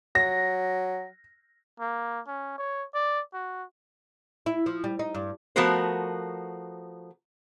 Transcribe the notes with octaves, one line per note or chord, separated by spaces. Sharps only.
F#3 A#6
A#3
C#4
C#5
D5
F#4
E4
F3
G3
D#4
G2
F3 A3 B3 F#4 A#4 C5